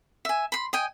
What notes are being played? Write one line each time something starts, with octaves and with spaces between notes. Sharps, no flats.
E5 G#5
B5 C6
D#5 G5 G#5